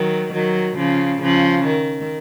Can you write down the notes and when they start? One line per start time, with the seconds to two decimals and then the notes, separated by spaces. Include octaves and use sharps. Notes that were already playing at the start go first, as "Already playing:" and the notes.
Already playing: D#3 F#3
0.33 D#3 F#3
0.77 C#3 F3
1.22 C#3 F3
1.67 D#3